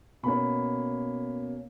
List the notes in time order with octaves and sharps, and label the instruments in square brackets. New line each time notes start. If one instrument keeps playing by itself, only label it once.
[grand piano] B2 A#3 C#4 B5